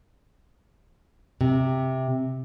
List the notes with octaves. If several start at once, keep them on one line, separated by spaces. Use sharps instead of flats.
C3